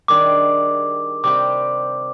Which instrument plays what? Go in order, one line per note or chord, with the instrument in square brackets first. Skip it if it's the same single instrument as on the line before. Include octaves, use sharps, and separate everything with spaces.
[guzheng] D#3 G3 D4 G#4 [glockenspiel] D6
[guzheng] C3 G3 C4 G4 [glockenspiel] D6